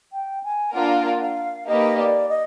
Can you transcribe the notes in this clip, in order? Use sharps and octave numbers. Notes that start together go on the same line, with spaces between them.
G5
G#5
A#3 D4 F4 A#4 F#5
F5
A#3 D#4 G4 B4 D#5
D5
D#5